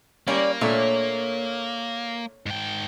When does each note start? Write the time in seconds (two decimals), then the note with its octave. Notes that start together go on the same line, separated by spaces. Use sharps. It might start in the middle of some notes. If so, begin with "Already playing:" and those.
0.28 G3 A#3 C#4 A#4 D5
0.61 A#2 A3 D4 C#5
2.46 G#2 G5